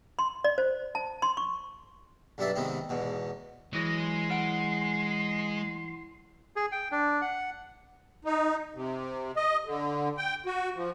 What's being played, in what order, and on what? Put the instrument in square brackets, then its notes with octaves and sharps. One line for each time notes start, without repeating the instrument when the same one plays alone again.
[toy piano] C6
D5
C5
A5
C6
C#6
[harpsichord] B1 G2 G3 D4 E5 A5
G#2 C3 D#3 B3 C4
E2 G#2 B2
[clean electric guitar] E3 F#3 [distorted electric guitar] G#3 [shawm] D#5
[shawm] C6
[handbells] E4 F#5 D7
[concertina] G#4
G5
D4
F#5
[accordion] D#4
C3
D#5
D3
G5
F#4
F3